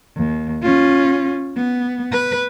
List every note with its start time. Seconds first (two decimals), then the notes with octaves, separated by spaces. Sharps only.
0.16 D#2
0.62 C#4 F4
1.57 B3
2.12 B4